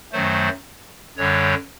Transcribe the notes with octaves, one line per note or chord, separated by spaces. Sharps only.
F#2 D#3 F#3 A3 C5
F#2 D3 G3 C#5